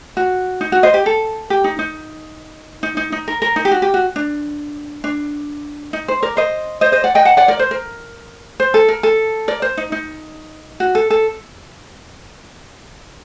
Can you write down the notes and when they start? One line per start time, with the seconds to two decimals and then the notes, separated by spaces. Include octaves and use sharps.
0.17 F#4
0.61 D#4
0.72 F#4
0.83 C5 D#5
0.94 G4
1.06 A4
1.50 G4
1.64 D#4
1.79 D#4
2.83 D#4
2.97 D#4
3.12 D#4
3.28 A#4
3.42 A#4
3.56 D#4
3.65 G4
3.71 F#4
3.82 G4
3.94 F#4
4.16 D4
5.04 D4
5.93 D#4
6.08 C5
6.23 A#4 D5
6.37 C5 D#5
6.81 C5 D#5
6.92 C5 D#5
7.04 D5 F#5
7.15 D#5 G5
7.25 F#5 A5
7.37 D5 F#5
7.48 A#4 D5
7.59 C5
7.71 A#4
8.60 C5
8.74 A4
8.88 A#4
9.03 A4
9.48 A#4 D5
9.62 C5
9.77 D#4
9.92 D#4
10.80 F#4
10.95 A4
11.10 A4